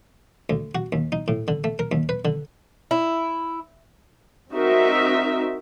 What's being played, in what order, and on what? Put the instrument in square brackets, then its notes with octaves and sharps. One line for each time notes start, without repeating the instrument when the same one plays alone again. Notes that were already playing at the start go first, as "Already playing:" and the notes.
[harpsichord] D2
F#4
D#2
D#4
A2
D3
A3
A#4
D#2
B4
D3
[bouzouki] E4
[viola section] C4 D#4 F#4 A#4 E5